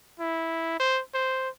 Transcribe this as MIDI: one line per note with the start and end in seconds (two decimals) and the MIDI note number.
0.20 0.77 64
0.80 1.01 72
1.14 1.49 72